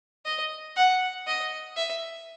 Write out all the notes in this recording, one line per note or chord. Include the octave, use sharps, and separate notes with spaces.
D#5
F#5
D#5
E5